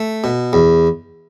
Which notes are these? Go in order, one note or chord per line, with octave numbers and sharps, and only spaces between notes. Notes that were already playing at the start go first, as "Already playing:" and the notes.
Already playing: A3
B2
E2